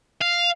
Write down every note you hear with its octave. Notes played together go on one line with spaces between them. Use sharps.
F5